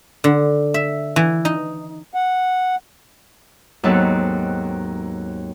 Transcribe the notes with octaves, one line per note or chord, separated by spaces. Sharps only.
D3
E5
E3
D#4
F#5
D#2 G#2 F#3 B3 C4 A4